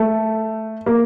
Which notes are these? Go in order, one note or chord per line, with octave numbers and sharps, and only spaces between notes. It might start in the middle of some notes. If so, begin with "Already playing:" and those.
Already playing: A3
A#3